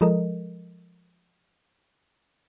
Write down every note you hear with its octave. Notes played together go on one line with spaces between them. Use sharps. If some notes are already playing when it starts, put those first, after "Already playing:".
F3 G#3 A4 A#4 D#5